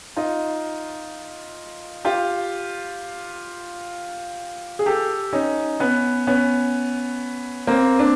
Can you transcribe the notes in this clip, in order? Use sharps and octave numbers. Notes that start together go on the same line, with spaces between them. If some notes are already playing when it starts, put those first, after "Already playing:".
D#4 F4
F4 G4
G#4
G4 A4
C#4 D#4
B3 C#4
B3 C#4
A#3 C4
C4 D4